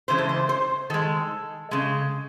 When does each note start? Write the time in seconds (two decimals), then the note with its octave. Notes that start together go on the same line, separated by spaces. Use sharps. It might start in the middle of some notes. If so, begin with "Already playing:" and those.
0.08 C#3 E3 G#3 C5
0.18 A4
0.29 C5
0.49 C5
0.90 D#3 G#3 A4
1.71 C#3 G#3